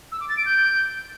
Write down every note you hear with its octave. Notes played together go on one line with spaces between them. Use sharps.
E6
D6
A6
D7
G6